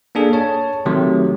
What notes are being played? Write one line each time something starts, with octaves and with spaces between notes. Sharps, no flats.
A#3 D4 G#4 A4
C#5 A5
C3 D#3 F#3 A3